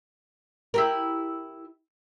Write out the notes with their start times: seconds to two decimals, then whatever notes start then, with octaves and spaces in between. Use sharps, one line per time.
0.74 E4 G4 A#4